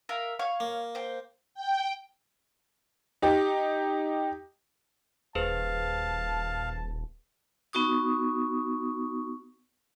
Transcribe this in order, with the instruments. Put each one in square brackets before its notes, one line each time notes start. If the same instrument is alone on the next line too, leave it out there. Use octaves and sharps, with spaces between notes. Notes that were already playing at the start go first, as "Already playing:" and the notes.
[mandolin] A#4 E5 F5
C#5 F5 C#6
[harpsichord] A#3
[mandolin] C5 G5
[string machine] G5
[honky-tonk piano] D#4 G4
[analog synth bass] D#1 [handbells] G#4 B4 C5 [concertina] F5 [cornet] A5
[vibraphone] B3 D#4 F#4 C#6 D#6